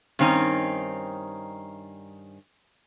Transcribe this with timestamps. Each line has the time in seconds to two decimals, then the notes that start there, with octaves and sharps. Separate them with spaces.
0.19 G2 D#3 C4 C#4 D#4